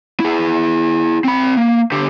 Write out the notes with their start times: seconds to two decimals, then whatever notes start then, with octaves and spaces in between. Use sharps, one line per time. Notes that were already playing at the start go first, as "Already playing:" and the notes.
0.20 E4 G#4
1.24 C4 B5
1.57 A#3
1.92 D3 G4